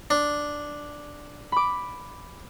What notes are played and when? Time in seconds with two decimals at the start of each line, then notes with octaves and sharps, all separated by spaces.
0.10 D4
1.52 B5 D6